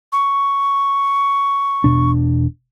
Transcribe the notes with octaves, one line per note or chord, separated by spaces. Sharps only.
C#6
E1 B2 D4